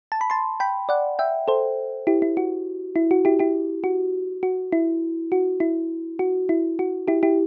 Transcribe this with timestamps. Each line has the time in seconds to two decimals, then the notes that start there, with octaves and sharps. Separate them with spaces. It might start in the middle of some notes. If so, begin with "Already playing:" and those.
0.12 A5
0.21 B5
0.30 A5 C6
0.60 G5 B5
0.89 D5 F#5
1.19 E5 G5
1.48 A4 C5
2.07 E4 G4
2.22 E4
2.37 F#4
2.96 E4
3.11 F#4
3.25 E4 G4
3.39 E4 G4
3.84 F#4
4.43 F#4
4.72 E4
5.32 F#4
5.60 E4
6.19 F#4
6.49 E4
6.79 F#4
7.08 E4 G4
7.23 E4 G4